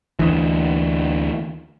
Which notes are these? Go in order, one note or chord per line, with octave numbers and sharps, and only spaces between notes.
D2 E3